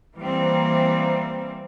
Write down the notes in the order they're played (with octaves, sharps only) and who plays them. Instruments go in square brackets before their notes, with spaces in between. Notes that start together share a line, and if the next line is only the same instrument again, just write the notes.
[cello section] E3 G3 A#3 C4